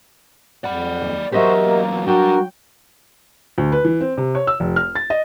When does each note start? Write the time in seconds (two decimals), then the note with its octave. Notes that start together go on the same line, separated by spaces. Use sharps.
0.64 F2 D5 F#5 B5
1.02 D#2
1.32 E2 F#3 F#4 G4 A#4 C5 D#5 E5
1.64 A#3
2.07 F#3 G3 D4 F#4 A#4 G5
3.58 D2
3.72 B4
3.85 E3
4.01 C4
4.18 C3
4.35 C#5
4.47 E6
4.60 F1
4.76 F6
4.95 A6
5.10 D#5